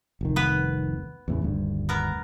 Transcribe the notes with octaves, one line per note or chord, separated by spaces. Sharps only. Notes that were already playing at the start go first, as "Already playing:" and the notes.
F1 C2 D#3
B3 B4
E2 A2 C#3
D#1 D2 G2
B3 A#4